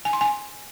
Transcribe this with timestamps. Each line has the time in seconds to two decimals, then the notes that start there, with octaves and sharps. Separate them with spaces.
0.05 G#5
0.13 C6
0.21 G#5